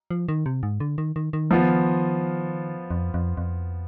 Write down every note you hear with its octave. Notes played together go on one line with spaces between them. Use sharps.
F3
D#3
C3
G#2
D3
D#3
D#3
D#3
F3 B3 F4
F2
F2
F2